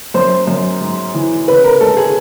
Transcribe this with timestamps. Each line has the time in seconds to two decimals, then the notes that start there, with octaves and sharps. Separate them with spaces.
0.14 F#2 C5
0.47 F#2
0.81 G#2
1.14 E3
1.47 C#3 B4
1.64 A#4
1.81 G#3 A4
1.97 G#4